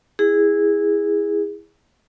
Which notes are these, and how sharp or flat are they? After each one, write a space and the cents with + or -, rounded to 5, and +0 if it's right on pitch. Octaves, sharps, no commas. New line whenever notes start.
E4 -10 G#4 -15